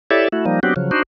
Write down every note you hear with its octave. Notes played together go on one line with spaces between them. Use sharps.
E4 G4 A4 C#5 D5 E5
A3 E4 F#4
F3 G3 A#3 D#4
F#3 B3 C4 D4 F#4 G4
C#3 F3 F#3
D4 D#4 F#4 C5